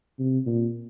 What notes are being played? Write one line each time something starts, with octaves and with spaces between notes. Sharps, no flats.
C3
A#2